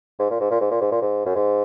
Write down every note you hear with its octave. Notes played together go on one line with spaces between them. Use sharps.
G#2
A#2
G#2
A#2
G#2
A#2
G#2
A#2
G#2
F#2
G#2